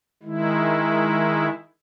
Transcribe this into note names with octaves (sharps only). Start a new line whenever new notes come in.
D#3 G#3 E4